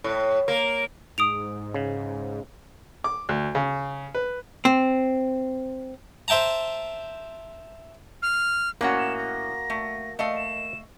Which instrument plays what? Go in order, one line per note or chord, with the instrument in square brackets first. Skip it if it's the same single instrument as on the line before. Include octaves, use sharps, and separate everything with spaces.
[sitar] A2
A#3
[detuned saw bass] G#2 [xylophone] D#6 D7 F7
[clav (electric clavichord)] C#3
[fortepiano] D6
D2
C#3
B4
[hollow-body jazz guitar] C4
[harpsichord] C5 E5 G5 A5 A#5
[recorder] F6
[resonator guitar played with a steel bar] A2 C#4 F#5 [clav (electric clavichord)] A#3 F#4
[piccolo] E7
A#6
[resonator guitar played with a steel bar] A3
A3 D#5 F5
[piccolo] E7